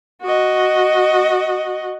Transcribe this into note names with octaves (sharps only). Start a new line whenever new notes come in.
F#4 D#5